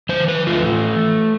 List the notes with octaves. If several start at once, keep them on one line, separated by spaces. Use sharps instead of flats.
E3 C5
B4
A3 F4